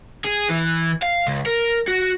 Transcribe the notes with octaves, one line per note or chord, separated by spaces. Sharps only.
G#4
E3
F5
C#2
A#4
F#4